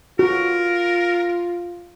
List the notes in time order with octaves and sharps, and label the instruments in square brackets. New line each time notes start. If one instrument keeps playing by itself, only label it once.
[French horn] F4 [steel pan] F#4 [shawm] A#4